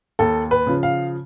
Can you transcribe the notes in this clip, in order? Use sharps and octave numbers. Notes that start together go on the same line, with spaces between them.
D#2 A4
B4
C#3 F3
F5